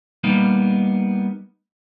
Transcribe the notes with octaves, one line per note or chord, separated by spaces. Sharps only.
G3 A#3 B3 D#4